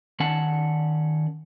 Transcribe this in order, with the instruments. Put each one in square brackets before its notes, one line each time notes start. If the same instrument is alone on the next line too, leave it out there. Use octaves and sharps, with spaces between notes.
[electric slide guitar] D#3 C#4 F#5 A5